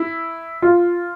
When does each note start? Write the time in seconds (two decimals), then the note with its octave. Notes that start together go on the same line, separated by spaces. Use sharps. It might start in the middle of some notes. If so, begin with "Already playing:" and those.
Already playing: E4
0.62 F4